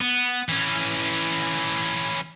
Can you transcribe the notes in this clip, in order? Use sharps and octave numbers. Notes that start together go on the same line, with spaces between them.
B3
E3 C#4